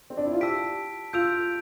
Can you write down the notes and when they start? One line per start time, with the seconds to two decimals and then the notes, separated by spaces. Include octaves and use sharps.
0.10 C4
0.17 D4
0.25 E4
0.33 F4
0.41 G4 A5 E6 B6 D7
1.13 F4 E6 G6 D7 F7